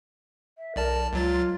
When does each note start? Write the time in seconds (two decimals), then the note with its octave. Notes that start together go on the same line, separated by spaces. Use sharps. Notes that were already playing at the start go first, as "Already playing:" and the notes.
0.58 E5
0.76 B1 A#4 D5 A5
1.13 C#2 F#3 F4 A6